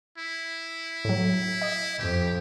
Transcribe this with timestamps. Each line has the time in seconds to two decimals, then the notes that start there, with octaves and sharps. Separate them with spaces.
0.18 E4
1.05 A2 F#3
1.62 D#5
1.99 F2 G4